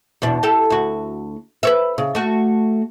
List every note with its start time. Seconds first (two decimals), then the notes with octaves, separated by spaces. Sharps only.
0.22 E2 B2 D4
0.43 G4 A4
0.70 D2 F#4
1.63 B4 C#5 E5
1.98 C#3
2.15 A3 F#4